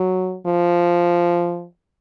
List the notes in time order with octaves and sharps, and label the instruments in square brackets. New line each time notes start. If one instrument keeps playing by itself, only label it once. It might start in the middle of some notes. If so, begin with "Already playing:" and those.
Already playing: [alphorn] F#3
F3